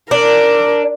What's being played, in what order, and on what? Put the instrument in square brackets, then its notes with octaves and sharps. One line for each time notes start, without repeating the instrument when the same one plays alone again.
[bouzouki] D4 [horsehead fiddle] A#4